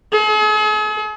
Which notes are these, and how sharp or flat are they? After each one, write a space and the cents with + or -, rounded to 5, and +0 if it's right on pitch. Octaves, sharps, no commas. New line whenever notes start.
G#4 +45